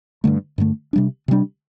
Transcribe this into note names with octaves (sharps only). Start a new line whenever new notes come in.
G2 D3 A3
G2 D3 A3
C3 G3 D4
C3 G3 D4